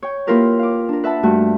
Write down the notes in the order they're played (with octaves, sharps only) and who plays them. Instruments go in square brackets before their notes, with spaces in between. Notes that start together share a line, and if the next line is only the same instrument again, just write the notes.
[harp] C#5 G5
A#3 E4 F4 G4 A#4 B4
F5 D6
D4 A#4
B4 E5 F#5 A5
G2 A3 F#4